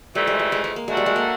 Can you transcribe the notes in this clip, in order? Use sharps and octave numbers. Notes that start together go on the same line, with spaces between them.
F2 C3 E3 G3 A3
G#3
G3
G#3
G#3
A#3
F#3 G#3 A3 D4 F#4 A4
G3
G#3
A#3